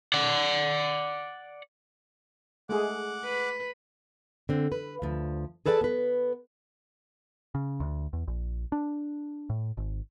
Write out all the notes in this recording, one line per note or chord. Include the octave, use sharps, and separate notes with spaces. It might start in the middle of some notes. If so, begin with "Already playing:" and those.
D5 F#5
G#3 A3 G#4 F#5 D6
B4
D3 C4
B4
D2 F3
G#4 A4 B4 D5 G#5 A5
B3 B4
C#3
D2
E2
A#1
D4
A2
G#1